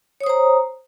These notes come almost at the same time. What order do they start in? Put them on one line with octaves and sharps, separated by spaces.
C#5 D#6 C5 A#5